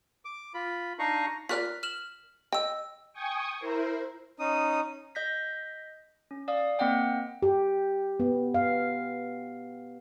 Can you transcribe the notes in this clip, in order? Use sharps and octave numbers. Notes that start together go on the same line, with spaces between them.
D6
F4 B5
D4 D#4 D#5 F5 A#5 C#6
F4 A#4 D5 F6 F#6 B6
F6 E7 F#7
D#5 G5 E6
G5 G#5 C#6 D#6
E4 A#4 C5
C#4 D#4 D#6
D#5 G6 A#6 B6
C#4
D5 F5 D#6
A#3 C4 D#5 F#5 G5
G4
B3
F5